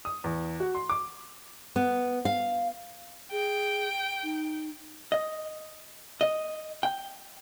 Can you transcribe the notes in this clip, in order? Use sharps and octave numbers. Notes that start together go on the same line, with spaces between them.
D#6
E2
F#4
C6
D6
B3
F5
G#4 G5
D#4
D#5
D#5
G5